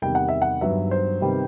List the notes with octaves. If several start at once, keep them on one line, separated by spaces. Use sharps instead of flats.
E2 C3 D#3 G3 G5
F#5
E5
F#5
G2 D#3 F#3 B3 E5
C5
C3 D#3 G3 B3